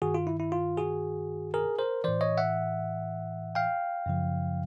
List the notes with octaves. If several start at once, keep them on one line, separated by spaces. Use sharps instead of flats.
G2 D#3 F#4 G#4
F4
E4
E4
F4
F#4 G#4
G#4 A#4
A#4 C5
A2 E3 C5 D5
C#5 D#5
E5 F#5
F5 G5
F#2 C#3 F3